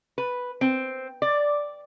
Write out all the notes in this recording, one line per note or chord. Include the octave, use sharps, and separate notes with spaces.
B4
C4
D5